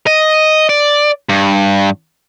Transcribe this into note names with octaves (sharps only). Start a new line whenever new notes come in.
D#5
D5
G2